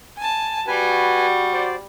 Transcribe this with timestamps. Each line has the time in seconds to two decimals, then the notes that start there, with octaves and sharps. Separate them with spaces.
0.17 G#5 A5
0.67 G3 F#4 B4 G#5
1.53 C5 D5